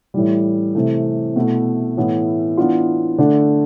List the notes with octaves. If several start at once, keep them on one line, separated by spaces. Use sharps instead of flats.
A2 E3 G3
C3 E3 A3
B2 A3 E4
A2 E3 B3 E4
E3 B3 D4 F4
D3 A3 D4